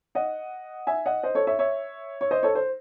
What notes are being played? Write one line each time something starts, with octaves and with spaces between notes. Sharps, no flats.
D#5 F#5
E5 G#5
D#5 F#5
C5 D#5
A4 C#5
C#5 E5
C#5 E5
C#5
C5 D#5
A4 C#5
C5